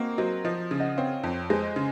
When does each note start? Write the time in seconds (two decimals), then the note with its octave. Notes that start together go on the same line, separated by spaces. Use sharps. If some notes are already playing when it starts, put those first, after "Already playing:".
Already playing: A#3 C4 D#4 F#4 A#4
0.18 F#3 C5 D#5
0.45 F3 C5 D#5
0.71 C#3
0.80 D#5 F#5
0.97 C4 C#5 F5
1.24 F2
1.50 G#3 C5 D#5
1.76 C#3